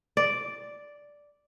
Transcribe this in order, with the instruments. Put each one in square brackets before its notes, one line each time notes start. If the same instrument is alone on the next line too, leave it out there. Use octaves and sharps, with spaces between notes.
[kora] D5